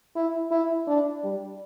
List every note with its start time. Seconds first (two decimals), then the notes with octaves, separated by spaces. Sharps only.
0.16 E4
0.52 E4
0.88 D4
1.24 G3